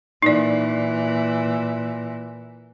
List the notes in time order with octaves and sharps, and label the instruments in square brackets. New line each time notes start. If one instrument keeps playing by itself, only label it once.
[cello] A#2 E3 [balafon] D#4 D5